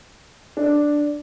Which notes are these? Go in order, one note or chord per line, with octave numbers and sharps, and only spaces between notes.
D4